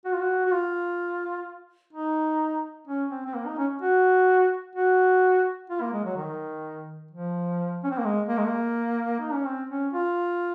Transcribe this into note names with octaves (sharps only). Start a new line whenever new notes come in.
F#4
F4
F#4
F#4
F4
D#4
C#4
C4
C4
A#3
D#4
C#4
F#4
F#4
F4
A#3
G#3
F#3
D#3
F3
C#4
C4
A#3
G#3
A#3
G#3
A#3
D#4
C#4
C4
C#4
F4